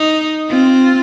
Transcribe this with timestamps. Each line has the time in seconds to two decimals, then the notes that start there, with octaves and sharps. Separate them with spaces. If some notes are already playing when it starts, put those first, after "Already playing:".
Already playing: D#4
0.49 C4 F4